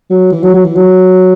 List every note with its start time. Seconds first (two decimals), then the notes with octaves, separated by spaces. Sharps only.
0.10 F#3
0.32 E3
0.43 F#3
0.54 F#3
0.65 E3
0.76 F#3